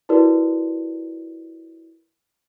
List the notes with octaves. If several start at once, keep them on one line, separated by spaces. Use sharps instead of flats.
E4 F#4 G4 A#4 B4 D5